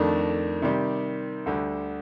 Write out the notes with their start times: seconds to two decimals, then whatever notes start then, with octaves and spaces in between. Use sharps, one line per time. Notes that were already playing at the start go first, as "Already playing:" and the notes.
Already playing: F2 D#3 A3 D4
0.62 C3 D#3 G3
1.46 D2 D3 G3